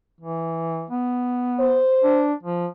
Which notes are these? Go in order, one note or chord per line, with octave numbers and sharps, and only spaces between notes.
E3
B3
C5
D4
F3